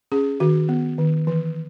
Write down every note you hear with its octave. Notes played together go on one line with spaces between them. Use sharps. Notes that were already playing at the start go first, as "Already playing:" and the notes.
C#4 G#4
D#3 F#4
B3
D#3
E3